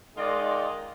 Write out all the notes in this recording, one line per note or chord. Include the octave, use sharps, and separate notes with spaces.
D#3 G#3 D#4 F4 D5 D#5